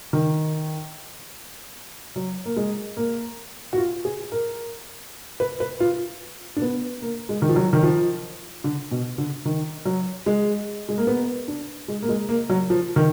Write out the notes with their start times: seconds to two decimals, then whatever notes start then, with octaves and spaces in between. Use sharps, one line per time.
0.13 D#3
2.16 F#3
2.45 A#3
2.56 G#3
2.97 A#3
3.73 F#4
3.78 F4
4.05 G#4
4.32 A#4
5.40 B4
5.60 B4
5.80 F4
6.56 D4
6.62 B3
7.02 A#3
7.29 G#3
7.42 D#3
7.49 F3
7.56 F#3
7.73 D#3
7.83 F3
8.64 D3
8.91 B2
9.18 D3
9.45 D#3
9.85 F#3
10.26 G#3
10.89 G#3
10.98 A#3
11.07 B3
11.48 D4
11.88 G#3
12.02 A#3
12.09 G#3
12.29 A#3
12.49 F#3
12.70 F3
12.96 D#3